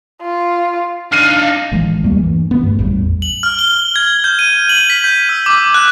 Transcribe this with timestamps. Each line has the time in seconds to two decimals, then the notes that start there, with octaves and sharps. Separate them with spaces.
0.22 F4
1.12 D4 D#4 F5 F6 C7 D#7
1.72 A1 D#3 E3 G#3
2.03 D#2 G3 A3 A#3
2.19 G2 E3
2.51 D#3 B3
2.63 G2 A3
2.79 A1 E2 G3
3.22 F#7
3.43 F6
3.59 G7
3.96 G#6
4.24 G6
4.39 D#7
4.69 F#7
4.90 B6
5.04 G6
5.29 E6
5.46 D6
5.74 F#6